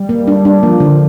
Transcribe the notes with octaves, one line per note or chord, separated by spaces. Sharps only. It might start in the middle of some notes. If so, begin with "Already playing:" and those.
Already playing: G3
A#3
D4
D4
F3 A#3
D3